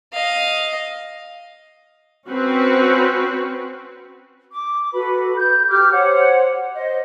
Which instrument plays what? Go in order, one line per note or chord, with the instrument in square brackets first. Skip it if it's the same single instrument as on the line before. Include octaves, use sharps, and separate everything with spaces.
[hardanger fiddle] D#5 F5
[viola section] C4 C#4 F#4 B4
[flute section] D6
F#4 A4 B4 B5
G6
G4 D6 F6 G6
C5 C#5 F#5
C5 D#5